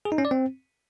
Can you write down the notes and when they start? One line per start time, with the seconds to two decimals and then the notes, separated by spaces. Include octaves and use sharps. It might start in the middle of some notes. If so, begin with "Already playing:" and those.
0.05 G#4
0.12 D#4
0.18 C#4
0.25 D5
0.31 C4